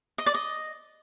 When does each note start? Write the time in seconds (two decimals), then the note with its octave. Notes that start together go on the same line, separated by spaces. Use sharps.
0.18 D#5
0.26 D5
0.34 D#5